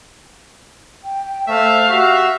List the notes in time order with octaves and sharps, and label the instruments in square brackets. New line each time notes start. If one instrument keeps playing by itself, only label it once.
[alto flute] G5
[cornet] A3 [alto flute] C5 [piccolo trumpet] E5 [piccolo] F5
[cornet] F#4 [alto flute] G4 [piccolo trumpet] E5